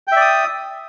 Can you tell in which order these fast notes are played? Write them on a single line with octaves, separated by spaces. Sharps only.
G5 E5 D5 D#6